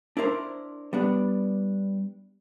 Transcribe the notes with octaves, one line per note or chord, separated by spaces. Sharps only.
D4 E4 A#4 C5
G3 B3 D4